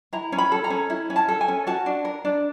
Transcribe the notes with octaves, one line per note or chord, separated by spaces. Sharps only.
E4 A#5
C#4
B5
A4
A#5
C#4
E4
C#4
A5
A4
G#5
C#4
F#4 A5
D4
A#4
D4